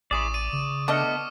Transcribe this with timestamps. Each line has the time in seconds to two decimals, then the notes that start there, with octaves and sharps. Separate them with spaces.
0.11 A1 E4 G#4 D5 C#6 D#6 E7
0.34 D5 D#7
0.53 C#3
0.88 A3 B3 D4 D#5 D6 F6 C#7